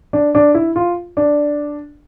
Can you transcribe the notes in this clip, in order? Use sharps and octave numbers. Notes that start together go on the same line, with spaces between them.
D4
D4
E4
F4
D4